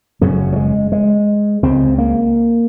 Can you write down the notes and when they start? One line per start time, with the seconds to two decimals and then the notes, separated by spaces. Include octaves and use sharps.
0.21 F#1 F#2 C#3 F#3
0.53 F#3
0.56 G#3
0.92 G#3
1.63 C#2 C#3 C4
1.98 A#3